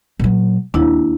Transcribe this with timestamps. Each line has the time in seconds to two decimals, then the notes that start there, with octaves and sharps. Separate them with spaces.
0.19 A#2 F#3
0.74 D#2 D4 E4